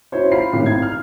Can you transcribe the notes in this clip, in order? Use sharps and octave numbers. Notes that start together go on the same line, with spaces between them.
E4 F#4 C5 C#5
F4 F5 B5 C7
G#1 A2 C3
G#6
F6